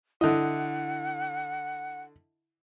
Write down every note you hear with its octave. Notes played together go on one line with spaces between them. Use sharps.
D3 E4 D#5 F#5